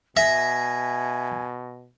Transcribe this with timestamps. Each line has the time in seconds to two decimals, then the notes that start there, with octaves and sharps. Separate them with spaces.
0.17 B2 E5 G#5 A#6